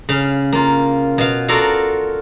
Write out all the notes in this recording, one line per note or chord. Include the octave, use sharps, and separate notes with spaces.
C#3 F5
A#3 F4
B2 F5
F4 F#4 A4 A#4 D5 F5